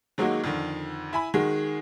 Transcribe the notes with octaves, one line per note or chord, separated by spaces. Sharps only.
D#3 F#3 G#3 A#3 D#4 F#4
F2 D3 D#3
E4 G#5 B5
D#3 G#3 F#4 G#4